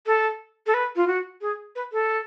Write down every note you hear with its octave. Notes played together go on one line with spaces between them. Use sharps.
A4
A4
B4
F4
F#4
G#4
B4
A4